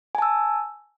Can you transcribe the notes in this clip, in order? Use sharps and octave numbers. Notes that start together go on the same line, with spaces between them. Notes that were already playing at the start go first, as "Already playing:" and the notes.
G#5 A5 E6